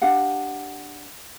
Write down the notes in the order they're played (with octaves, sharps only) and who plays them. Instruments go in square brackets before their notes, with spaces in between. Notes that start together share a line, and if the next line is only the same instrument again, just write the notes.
[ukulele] D4 G4 F5 F#5